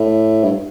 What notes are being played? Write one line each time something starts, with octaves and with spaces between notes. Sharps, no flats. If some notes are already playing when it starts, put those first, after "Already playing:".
Already playing: A2
G2